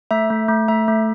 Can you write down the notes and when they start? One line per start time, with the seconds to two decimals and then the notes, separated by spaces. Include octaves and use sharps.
0.11 A3 E5
0.30 A3
0.49 A3
0.68 A3 E5
0.88 A3